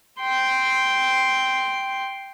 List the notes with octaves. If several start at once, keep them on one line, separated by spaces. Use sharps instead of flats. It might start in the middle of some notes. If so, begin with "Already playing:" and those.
G5 C6